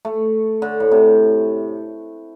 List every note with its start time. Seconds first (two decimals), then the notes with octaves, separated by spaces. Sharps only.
0.05 A3
0.62 D3
0.80 A2
0.91 C3